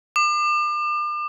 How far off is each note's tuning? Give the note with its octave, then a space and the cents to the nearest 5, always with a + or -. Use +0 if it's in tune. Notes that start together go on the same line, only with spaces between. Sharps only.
D6 +40